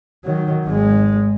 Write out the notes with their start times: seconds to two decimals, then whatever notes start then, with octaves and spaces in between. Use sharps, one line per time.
0.25 D#3 F#3
0.65 G#1 G#3